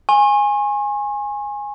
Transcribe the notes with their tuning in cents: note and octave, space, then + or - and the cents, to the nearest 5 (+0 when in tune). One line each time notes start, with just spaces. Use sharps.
G#5 -10 C#6 -45